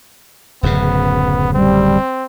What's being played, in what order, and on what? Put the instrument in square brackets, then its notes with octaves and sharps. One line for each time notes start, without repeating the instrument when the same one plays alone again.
[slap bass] D1 F#2 C#3 [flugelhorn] B3
[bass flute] G3 [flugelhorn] C4